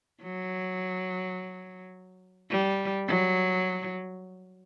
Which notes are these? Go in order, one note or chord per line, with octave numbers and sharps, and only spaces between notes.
F#3
G3
F#3